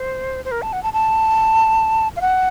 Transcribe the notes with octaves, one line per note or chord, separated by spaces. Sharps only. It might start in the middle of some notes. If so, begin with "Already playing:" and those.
Already playing: C5
C5
A#4
A5
F#5
A5
A5
F5
F#5